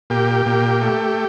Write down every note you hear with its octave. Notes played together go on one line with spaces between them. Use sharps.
A#2 G4
A#2
A3